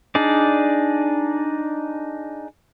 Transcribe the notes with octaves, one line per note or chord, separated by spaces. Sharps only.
D4 D#4 G#4 D5